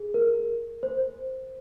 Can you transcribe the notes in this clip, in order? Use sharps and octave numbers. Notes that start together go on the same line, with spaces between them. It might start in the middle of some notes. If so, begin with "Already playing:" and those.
Already playing: G#4
A#4
C5